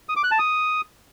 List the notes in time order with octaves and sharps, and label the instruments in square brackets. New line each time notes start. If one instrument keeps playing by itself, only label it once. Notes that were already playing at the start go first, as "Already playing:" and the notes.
[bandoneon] D#6
D6
F#6
A5
D#6